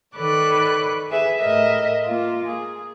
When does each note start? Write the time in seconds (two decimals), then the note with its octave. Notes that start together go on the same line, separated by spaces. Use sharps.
0.16 D#3 A4 B4 C#5 D5 F#6
1.09 G#4 B4 E5 G#5
1.40 A2 A#4 D#5 E5
2.04 A#3 F4
2.47 G#4